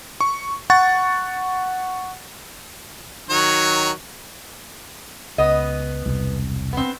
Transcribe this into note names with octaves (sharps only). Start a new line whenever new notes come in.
C#6
F#5 C#6 A6
D#3 F#3 C#5
C#2 B3 D#5
E1 C2
B3 C4